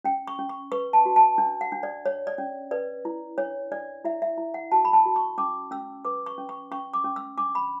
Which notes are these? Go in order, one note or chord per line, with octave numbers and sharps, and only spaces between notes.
C#4 G5
C#6
C#4
C#6
B4 C#6
A5
F#4
A5
D4
F#5
D4
D5
C#5
D5
C#4
B4 D5
E4
D4 C#5
D4 D5
E4 E5
E5
E4
F#5
F#4 A5
B5
A5
F#4
C#6
C#4 D6
C#4 E6
B4 D6
C#6
C#4
C#6
C#4 C#6
D6
C#4
E6
D4 D6
B5